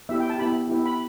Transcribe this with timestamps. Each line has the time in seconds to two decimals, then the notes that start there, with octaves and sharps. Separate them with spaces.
0.09 B3 E4 G4 E5
0.20 G5
0.30 A5
0.38 B3 E4 G4 B5
0.68 B3 E4 G4
0.86 B5